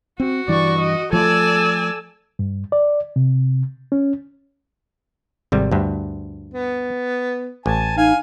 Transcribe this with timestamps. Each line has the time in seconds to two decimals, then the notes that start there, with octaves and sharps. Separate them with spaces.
0.20 C4 F#4
0.48 G2 E3 D5 C#6
0.79 D#5
1.13 F3 A3 A4 D5 G#5 E6
2.39 G2
2.72 D5
3.16 C3
3.92 C#4
5.52 G#1 C3 G3
5.72 D2 G2
6.54 B3
7.66 A1 G#5 A5
7.97 D#4 F5 G#5